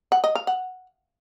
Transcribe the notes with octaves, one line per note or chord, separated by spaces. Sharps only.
F#5
D#5
F5
F#5